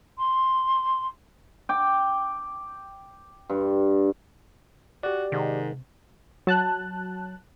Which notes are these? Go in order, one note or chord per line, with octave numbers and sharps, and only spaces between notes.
C6
G5 D6
G2
F#4 G4 D5
G#2 C3 D#3
F#3 A5 F#6